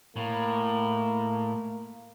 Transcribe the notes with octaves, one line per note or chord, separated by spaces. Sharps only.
A2 A#3